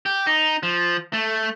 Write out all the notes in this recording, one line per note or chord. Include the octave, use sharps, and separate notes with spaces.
G4
D#4
F3
A3